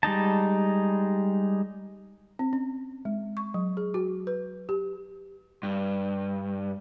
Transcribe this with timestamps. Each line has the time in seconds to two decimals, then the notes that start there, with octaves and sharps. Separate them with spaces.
0.03 G3 G#3 D#4 A5
2.39 C4
2.53 C#4
3.05 G#3
3.37 C#6
3.54 F#3
3.77 G#4
3.94 F#4
4.27 B4
4.69 G4
5.63 G2